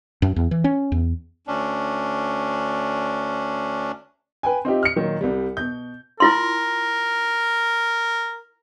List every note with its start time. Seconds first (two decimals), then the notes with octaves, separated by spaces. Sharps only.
0.22 F#2
0.36 E2
0.51 E3
0.64 C#4
0.92 E2
1.47 D2 C#4 D4
4.43 B4 G5 G#5
4.65 C4 D#4 F4 G4 E5
4.83 F6 C#7
4.96 A#2 D#3 F#3
5.21 C2 G3
5.57 B2 G6
6.20 E4 F4 A#4 C6